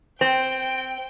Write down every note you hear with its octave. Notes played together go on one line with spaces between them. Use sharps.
C4 G5